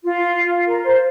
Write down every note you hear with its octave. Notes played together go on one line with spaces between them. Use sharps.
F4
A#4
C5